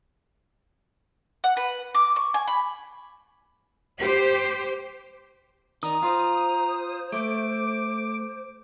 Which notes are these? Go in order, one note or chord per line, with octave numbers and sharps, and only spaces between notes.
F#5
B4
D6
C#6
G#5
B5
G4 C5
D#3 D5 A#5 D#6
F4 C5
A3 D6 D7